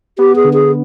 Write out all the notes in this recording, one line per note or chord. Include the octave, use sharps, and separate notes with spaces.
B3 G4
G#4
D3
G#4